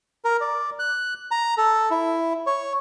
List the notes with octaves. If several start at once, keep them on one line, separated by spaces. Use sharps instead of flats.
A#4
D5
F#6
A#5
A4
E4
C#5